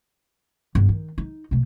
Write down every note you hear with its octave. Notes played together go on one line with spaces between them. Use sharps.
G1
D#3
D#4
B2 A3